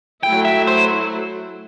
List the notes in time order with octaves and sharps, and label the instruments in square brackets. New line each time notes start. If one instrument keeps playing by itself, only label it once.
[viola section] F#3 A3 E4 [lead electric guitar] G5
[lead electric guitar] E5
C5